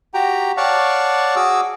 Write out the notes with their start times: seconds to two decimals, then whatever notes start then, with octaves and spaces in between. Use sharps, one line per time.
0.14 F#4 G4 G5 A#5
0.57 C#5 D5 F5 F#5 A5 C#6
1.36 F#4 G#4 D6 E6